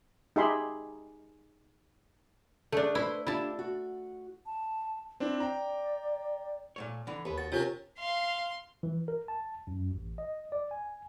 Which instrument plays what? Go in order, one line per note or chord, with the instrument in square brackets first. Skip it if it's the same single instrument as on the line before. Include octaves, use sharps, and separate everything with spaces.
[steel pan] D#4 G4 G#4 E5 B5 C6
[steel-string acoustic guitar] D3 G#4 A4 [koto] A3 D4
[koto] E4 [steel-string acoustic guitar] B4 C5
[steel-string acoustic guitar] D4 F4 G4 [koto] E4 A5
[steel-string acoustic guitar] F#4
[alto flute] A5
[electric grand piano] C4 D4 [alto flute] E4
[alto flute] D5 [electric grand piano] G5 A#5
[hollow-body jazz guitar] A#2 A3 C#5
D3 E3
[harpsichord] D#2 [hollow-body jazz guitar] A4 B4
[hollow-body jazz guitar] F#4 [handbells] A6
[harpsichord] C3 C#4 A#4 [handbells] F4 C#5
[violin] F5 [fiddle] C6
[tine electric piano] E3
A#4
A5
F#2
A1
D#5
D5
G#5